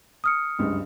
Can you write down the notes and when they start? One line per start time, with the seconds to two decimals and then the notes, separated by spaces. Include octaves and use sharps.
0.24 D#6 F6 C#7
0.59 F#1 C#2 G2